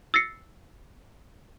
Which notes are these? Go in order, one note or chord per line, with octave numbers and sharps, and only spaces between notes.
E6 A6 A#6 C7 C#7